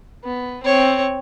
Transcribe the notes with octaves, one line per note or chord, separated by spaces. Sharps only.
B3
C4 C#5